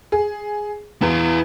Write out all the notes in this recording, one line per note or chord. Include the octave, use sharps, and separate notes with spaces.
G#4
E2 E4 F5